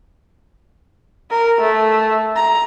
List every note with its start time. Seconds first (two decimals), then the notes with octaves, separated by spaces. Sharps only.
1.31 A#4
1.61 A3
2.36 A#5